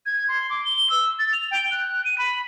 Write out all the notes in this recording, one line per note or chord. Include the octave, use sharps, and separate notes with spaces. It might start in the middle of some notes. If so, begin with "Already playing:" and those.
G#6
C6
D6
G7
E6
A6
F7
G5
F#6
D#7
B5